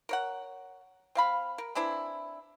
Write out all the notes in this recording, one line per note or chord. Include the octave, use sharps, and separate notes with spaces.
A#4 C#5 F#5
C4 F5 B5
A#4
E3 C4 D4 E4